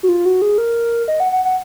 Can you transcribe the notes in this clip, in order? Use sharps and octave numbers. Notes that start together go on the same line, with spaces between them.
F#4
F4
F#4
G#4
A#4
D#5
F#5
F#5
F#5